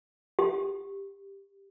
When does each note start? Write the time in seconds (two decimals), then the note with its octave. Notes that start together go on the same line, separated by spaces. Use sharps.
0.39 G4